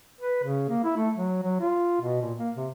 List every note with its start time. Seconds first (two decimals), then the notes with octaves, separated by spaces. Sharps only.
0.21 B4
0.43 C#3
0.69 A#3
0.84 E4
0.97 A3
1.16 F#3
1.43 F#3
1.60 F4
2.01 B2
2.22 A#2
2.38 A#3
2.57 C3